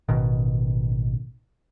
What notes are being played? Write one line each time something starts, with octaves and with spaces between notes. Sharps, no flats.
A1 B2 D#3